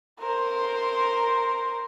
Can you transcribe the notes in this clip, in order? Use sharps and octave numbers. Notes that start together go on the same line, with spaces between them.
A#4 C5